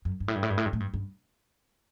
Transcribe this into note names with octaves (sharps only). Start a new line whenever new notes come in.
F#2
G2
A2
G2
A2
G2
A2
G2
A2
G2
G2